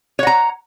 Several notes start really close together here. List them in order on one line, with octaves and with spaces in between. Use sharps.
C#5 F#5 A#5